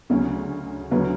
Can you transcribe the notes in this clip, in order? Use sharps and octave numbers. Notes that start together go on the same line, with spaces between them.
D2 C#3 F#3 C#4
D2 C#3 F#3 B3